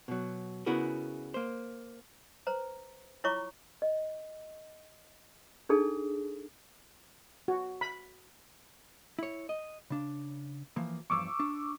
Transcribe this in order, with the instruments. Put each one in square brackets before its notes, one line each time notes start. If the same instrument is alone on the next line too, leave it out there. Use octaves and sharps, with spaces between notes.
[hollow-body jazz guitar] B2 F#3
C#3 B3 E4 F#4 G#4 A#4
A#3 C5
[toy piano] B4 C5 A#5
E4 F4 C#5 A#5 C#6 D6
D#5
D4 D#4 G#4 A4 A5
[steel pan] F#4
B5
[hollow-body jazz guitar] E4 C#5
D#5
C#3 D4
E3 F3 A#3
[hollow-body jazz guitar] E2 G2 F3 [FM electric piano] C#6 D6 E6
[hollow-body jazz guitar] D4